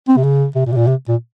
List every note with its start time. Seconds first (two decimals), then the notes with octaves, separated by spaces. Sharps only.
0.08 C4
0.17 C3
0.24 C#3
0.55 C3
0.66 A#2
0.72 C3
0.76 A#2
0.87 C3
1.08 A#2